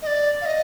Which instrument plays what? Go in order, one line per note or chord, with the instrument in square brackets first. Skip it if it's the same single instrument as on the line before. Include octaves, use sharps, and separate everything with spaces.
[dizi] D#5
D5
F5
D#5